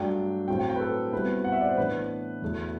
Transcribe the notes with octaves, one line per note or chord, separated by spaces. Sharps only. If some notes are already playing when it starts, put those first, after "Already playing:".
Already playing: G2 F#3 A3 D4 G5
A2 F#3 C4 G5
G5
G5
B4
A4
B2 G3 C4 E4 B4
F#5
E5
D5
C5
A2 E3 B3 D4 B4
E2 B2 A3 E4